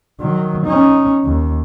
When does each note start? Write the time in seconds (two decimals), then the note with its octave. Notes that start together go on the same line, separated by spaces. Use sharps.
0.21 D#3 F#3
0.66 C#4 D#4
1.25 D#2